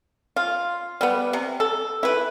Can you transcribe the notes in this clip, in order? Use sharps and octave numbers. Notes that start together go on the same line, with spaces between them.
F4
G3 B3
C3
A4
E4 B4